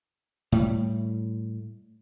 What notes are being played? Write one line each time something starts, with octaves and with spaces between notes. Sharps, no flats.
A2 G3